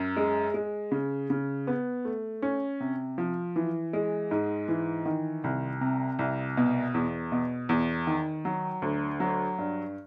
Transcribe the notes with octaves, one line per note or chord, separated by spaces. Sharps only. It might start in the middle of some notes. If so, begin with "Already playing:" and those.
Already playing: F#2
G#3
G#3
C#3
C#3
B3
A3
C#4
C3
F3
E3
G#3
G#2
E3
D#3
C2
C3
C2
B2
E2
B2
E2
D#3
F#3
D2
F#3
G2